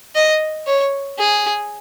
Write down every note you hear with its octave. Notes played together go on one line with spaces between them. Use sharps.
D#5
C#5
G#4